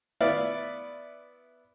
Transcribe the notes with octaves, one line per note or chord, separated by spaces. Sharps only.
B3 E4 D5 F5